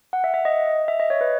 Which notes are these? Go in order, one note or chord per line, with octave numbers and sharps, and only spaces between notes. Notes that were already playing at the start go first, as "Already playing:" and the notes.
F#5
E5
E5
D#5
E5
D#5
C#5
B4